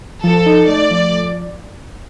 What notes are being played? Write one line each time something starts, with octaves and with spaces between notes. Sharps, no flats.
F3 A4
D#4
A3 D5
F3